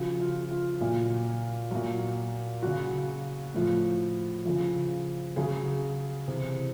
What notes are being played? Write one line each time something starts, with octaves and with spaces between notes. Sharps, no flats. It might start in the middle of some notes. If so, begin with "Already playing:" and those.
Already playing: C#3 F3 F#4
F4
F4
A#2 F#3
A#2 F#3
C#3 F#3 F#4
A2 F3
C#3 F3
C#3 F#3 G#4
C3 E3